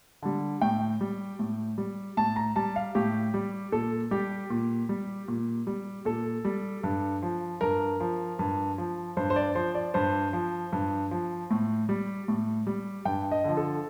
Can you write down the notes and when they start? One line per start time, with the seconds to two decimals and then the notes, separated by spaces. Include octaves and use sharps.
0.23 D3 G3
0.61 A2 G5
1.01 G3
1.39 A2
1.78 G3
2.17 A2 A5
2.36 A#5
2.56 G3 A5
2.76 F5
2.95 A2 G4
3.34 G3
3.72 A#2 A4
4.11 G3 G4
4.50 A#2
4.89 G3
5.28 A#2
5.67 G3
6.05 A#2 A4
6.45 G3
6.83 G2
7.23 F3
7.61 G2 A#4
8.00 F3
8.39 G2
8.78 F3
9.17 G2 C5
9.30 C5
9.36 D5
9.55 F3 C5
9.75 D5
9.94 G2 C5
10.33 F3
10.73 G2
11.11 F3
11.51 A2
11.89 G3
12.28 A2
12.67 G3
13.05 G2 G5
13.31 D#5
13.44 D3 F3
13.57 A4